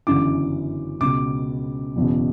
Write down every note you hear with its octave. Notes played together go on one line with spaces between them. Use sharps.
G1 F#2 C#3 E3 D6
C#2 B2 D6
F#1 E2 B2